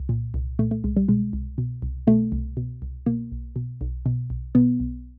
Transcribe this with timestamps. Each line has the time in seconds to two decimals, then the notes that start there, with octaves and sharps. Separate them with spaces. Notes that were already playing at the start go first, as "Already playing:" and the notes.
Already playing: C2
0.09 A#2
0.34 C2
0.59 A#2 A3
0.71 A3
0.84 C2 G#3
0.97 G3
1.08 B2 G#3
1.33 C2
1.58 B2
1.82 C2
2.07 B2 A3
2.32 C2
2.57 B2
2.82 C2
3.06 B2 A#3
3.32 B1
3.56 B2
3.81 B1
4.06 B2
4.30 B1
4.55 B2 B3
4.80 B1